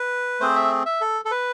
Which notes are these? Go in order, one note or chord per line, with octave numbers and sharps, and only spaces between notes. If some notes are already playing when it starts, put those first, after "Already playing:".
Already playing: B4
A3 C4 G#4 C5
E5
E5
A4
A4
B4